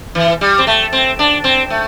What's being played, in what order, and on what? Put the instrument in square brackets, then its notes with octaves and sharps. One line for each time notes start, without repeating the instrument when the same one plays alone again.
[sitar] E3
G3
C4
A3
C4
D4
C4
A3